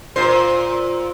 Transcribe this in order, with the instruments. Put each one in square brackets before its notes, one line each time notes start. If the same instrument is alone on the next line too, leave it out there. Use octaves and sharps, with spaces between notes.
[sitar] A#2 C5